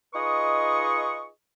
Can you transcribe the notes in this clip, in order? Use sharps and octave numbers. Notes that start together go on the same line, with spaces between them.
D#4 F4 G#4 B4 D#5 C#6